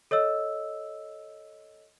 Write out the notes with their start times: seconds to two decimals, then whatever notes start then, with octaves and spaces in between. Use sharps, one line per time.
0.11 A4 C#5 D#5 E6